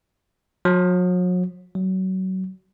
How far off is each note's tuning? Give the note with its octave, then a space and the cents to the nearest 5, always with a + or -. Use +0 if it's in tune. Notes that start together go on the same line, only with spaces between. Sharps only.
F#3 -40
F#3 +25